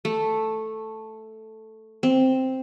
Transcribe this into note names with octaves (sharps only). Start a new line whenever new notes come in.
A3
C4